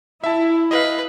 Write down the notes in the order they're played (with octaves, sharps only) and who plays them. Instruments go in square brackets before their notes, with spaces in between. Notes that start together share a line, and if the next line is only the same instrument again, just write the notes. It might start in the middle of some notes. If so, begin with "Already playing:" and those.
[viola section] E4 [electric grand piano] E5 A5
[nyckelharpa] B4 [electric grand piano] D#5 F5